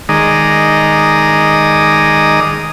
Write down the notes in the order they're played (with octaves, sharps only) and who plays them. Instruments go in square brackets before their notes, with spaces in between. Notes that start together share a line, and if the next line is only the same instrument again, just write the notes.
[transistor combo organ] D#3 G#3 D5 A#5 D#6